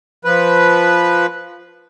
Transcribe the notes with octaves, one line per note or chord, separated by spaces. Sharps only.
F3 B4